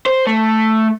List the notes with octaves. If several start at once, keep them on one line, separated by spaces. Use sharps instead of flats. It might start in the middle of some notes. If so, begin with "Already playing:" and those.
C5
A3